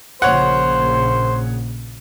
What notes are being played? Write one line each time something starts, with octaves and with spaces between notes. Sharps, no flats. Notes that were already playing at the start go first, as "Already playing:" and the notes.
A#1 A#2 C#3 C5 C#5 F#5